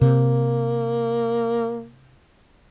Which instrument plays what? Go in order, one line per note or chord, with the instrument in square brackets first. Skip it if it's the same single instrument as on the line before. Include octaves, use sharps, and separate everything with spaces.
[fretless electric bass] C3 [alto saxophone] A#3